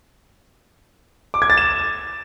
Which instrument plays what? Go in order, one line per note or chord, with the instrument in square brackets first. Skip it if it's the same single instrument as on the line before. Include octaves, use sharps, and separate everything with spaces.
[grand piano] D6
G#6
A6
E7